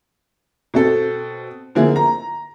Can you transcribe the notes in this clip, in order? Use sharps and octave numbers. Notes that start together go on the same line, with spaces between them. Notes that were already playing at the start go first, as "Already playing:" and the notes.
B2 C4 A4
D3 F3 A#3 E4 G#4
A#5